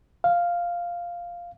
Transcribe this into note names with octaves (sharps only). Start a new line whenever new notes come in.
F5